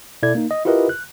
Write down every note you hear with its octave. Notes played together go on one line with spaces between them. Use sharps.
B2 E4 A4 D5 G#6
A#3 D#4
D#5
E4 F4 G4 A#4 B4 D#5
F#6